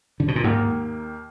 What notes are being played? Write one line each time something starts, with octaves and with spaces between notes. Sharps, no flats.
D3
B2
A#2
D#2 G#2 D#3 A#3